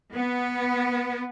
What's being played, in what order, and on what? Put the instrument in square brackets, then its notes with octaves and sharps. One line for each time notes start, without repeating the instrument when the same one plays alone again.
[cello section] B3